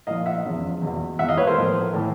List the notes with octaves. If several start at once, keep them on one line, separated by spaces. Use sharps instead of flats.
A#2 F3 D#5 F5
E5 F#5
E2 C#3 F3
E2 B2
E2 B2 E5 F#5
D#5 F5
B4 C#5
A#4 C5
A2 F3
A2 E3